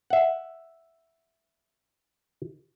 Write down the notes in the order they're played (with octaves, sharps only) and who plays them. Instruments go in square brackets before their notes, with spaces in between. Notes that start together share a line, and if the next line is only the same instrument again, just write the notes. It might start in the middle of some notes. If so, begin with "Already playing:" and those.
[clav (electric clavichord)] E5 F#5